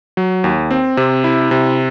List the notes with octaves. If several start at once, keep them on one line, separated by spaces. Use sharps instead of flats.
F#3
D#2
C4
C3
E4
C3